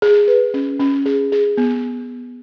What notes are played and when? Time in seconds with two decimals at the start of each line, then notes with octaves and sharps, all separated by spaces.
0.02 G#4
0.28 B4
0.54 C#4
0.80 C#4
1.06 G#4
1.32 G#4
1.57 B3